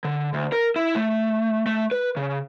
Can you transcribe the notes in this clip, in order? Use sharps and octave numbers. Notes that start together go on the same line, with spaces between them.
D3
D2
A#4
E4
A3
A3
B4
C#3